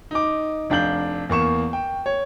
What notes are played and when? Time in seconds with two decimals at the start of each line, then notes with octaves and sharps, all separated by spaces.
0.11 D#4 D6
0.70 F1 D4 F5 G6 F#7
1.29 E2 A#3 C#6 E7
1.73 G5
2.06 C#5